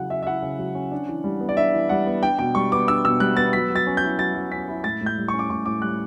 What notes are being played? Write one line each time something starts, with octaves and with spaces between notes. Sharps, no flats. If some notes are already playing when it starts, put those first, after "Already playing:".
Already playing: C#3 F#3 E4 F#5
C#4 E5
E5
E4 F#5
C#3
F#3
C#4
D4
E3
G3
B3
D5
D4 E5
E3
G3 F#5
B3
D4 G5
B2 G5
G3 C#6
B3 D6
D4 E6
B2 E6
G3 F#6
B3 A6
F#3 B6
F#3
A6
C#4
G6
E4
F#3 A6
F#3
C#4 B6
E4
A2 A6
A2
G6
G3
C#4 C#6
D6
A2 C#6
A2 D6
G3 F#6